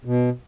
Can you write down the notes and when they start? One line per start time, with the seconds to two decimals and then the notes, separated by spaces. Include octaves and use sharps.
0.05 B2